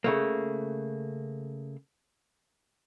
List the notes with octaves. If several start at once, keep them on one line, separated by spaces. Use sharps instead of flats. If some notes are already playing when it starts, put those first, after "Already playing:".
C#3 A3 A#3